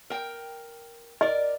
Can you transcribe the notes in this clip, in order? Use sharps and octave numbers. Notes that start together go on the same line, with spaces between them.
A#4 G5
A#4 D5 D#5